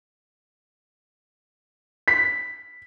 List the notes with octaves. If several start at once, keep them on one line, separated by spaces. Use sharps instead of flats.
B6